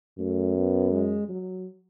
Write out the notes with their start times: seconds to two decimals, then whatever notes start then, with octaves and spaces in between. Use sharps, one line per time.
0.19 F#2 A3
0.56 B3
0.91 G#3
1.29 F#3